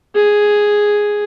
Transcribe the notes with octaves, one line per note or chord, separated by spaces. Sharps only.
G#4